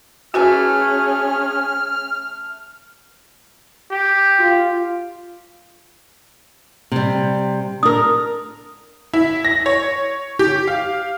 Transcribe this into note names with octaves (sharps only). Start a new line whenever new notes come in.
E3 A3 C#4 F#4 G#4 G#5 F6
G4
F4
C3 G3
D4 A#4 D#6
E4
A#6
C#5
G4
F5